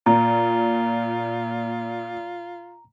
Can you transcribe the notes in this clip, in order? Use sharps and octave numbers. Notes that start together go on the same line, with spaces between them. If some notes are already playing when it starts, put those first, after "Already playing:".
A#2 F4 A#5